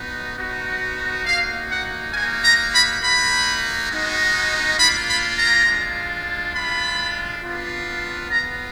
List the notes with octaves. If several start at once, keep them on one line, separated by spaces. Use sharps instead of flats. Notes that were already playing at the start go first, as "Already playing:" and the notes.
Already playing: B3 D#4 F#4
B3 D#4 F#4
A#3 D#4 F#4 F5
F#5
A#3 D#4 F#4 G#5
A#5
B5
A#3 D#4 F#4 B5
G#3 B3 D#4 F#4
A#3 D4 F4 B5
B5
A#5
G#3 D4 F4
G#3 D4 F4 B5
B3 D4 F4
B3 F4 A#5